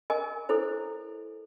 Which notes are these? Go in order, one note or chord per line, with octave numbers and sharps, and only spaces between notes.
A#4 D#5 G#5
E4 A4 C5